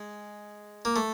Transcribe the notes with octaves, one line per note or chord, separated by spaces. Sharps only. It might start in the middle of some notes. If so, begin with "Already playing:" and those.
Already playing: G#3
A#3
A3